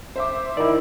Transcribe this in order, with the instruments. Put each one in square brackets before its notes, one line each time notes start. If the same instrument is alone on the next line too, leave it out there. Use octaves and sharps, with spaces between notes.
[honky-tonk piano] C5 E5 D6
[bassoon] D#3 [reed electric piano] E4 D5